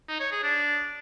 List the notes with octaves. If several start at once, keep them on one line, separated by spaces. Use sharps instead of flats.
D#4
C#5
G#4
D4